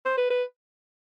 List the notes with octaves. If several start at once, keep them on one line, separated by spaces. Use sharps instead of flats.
C5
B4
B4